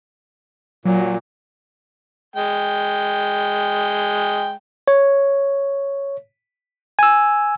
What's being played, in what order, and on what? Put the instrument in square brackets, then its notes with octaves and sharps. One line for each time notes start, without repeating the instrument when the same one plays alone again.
[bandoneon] A#2 [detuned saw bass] F#3
[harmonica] G#3 G5
[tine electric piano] C#5
G#5 E6